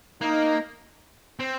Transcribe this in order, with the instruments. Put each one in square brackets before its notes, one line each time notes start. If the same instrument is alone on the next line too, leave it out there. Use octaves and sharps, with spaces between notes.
[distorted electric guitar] A#3 [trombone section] D#4
[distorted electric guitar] C4